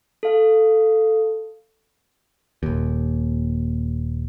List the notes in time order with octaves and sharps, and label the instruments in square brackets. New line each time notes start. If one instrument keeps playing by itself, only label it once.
[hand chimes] A4 F5
[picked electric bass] D#1 D#2